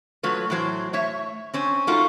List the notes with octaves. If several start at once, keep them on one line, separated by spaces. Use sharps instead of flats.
F#3 A3 F4 B4
A2 E3 F#3 C5
A3 C#5 E5
C4 C#4 C5
A3 D#4 F4 F#4 A#4 F5